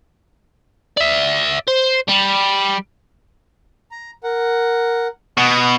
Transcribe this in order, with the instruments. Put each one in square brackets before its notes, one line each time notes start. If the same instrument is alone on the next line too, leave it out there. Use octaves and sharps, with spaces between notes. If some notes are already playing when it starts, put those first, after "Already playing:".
[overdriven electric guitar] D5 E5
C5
G3
[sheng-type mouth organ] A#5
A#4 F#5
[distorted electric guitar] B2 [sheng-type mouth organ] F#5 D#6